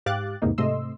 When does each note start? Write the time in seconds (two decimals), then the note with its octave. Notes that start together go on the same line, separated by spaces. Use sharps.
0.06 G#2 G4 F5 D6 F#6 A6
0.42 E2 G#2 C3 E3 A#3 D#4
0.58 G#2 C3 A3 D#5 C6 E6